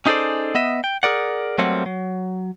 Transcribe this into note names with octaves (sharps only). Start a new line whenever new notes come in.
C#4 D#4 G#4 A4 C5 D5
B3 D#5 E5
G5
G#4 A#4 D5 F#5
F#3 G3 A3 A#3 C4 F#5
F#3